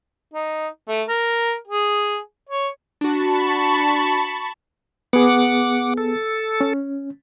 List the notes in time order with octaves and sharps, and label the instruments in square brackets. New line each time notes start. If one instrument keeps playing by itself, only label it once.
[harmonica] D#4
A3
A#4
G#4
C#5
[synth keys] D4 F#4 [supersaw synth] A5 B5 C#6
[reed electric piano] B3 G#4 [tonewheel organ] F#5 D6
[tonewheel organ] A4
[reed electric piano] C#4